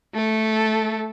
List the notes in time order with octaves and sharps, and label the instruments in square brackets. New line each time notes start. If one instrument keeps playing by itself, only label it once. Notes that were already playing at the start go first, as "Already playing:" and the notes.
[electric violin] A3 A4